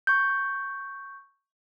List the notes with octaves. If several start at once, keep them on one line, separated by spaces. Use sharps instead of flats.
C#6 G6